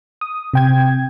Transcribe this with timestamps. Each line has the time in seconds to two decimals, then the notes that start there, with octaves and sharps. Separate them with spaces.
0.21 D#6
0.54 C3 G5 G#6